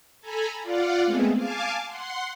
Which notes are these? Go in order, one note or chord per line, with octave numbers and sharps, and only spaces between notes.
A4 G#5 A#5 B5
F4 D5 F5 F#5
G#3 A3 B3 C4 G#4
F5 G#5 A5 D6
F#5 C6